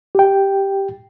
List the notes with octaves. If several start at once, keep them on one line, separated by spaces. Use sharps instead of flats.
G4 G5